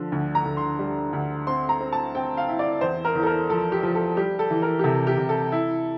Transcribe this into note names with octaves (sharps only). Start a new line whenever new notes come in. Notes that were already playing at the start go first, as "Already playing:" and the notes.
Already playing: D3 F3
D2
A#5
D2
C6
G3
D2
C4 C6
A#5
C4
A5
C4 G5
F5
E4
D5
E2 C5
A#4
E2
A4
A#4
F3 A4
G4
F3
A4
G3 G4
A4
E3
A#4
G4
C3 A4
G4
C3
A4
E4